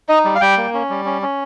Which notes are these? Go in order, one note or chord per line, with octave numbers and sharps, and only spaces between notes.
D#4 D#5
G3
F5
G3 G5
A#3
C#4
G3
C#4
C#4